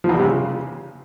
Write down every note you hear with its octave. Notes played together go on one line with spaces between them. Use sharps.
F3
E2
G3
C3
C#3